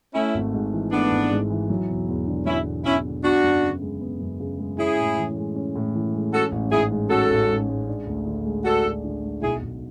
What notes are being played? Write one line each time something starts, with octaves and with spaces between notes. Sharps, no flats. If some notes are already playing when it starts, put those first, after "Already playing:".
A3 C#4 E4
G#1
G#2
E3
A3 B3 D4
G#1
G#2
E3
F#3
E1
E2
D3
F#3 C#4 E4
E1
E2 C#4 E4
D3
B3 D4 F#4
F#2
C#3
G#3
B3
F#2
C#3
G#3
C#4 E4 G#4
A2
E3
G#3
C#4
A2
E3
G#3
C#4 F#4 A4
A1
G#2 E4 G#4
G#3
C#4 F#4 A4
A1
G#2
G#3
D4
D2
D3
G#3
D4 F#4 A4
D2
D3
G#3
B1 E4 G#4
B1